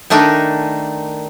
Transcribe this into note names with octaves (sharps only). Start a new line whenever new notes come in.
D#3 A3 D4 D#4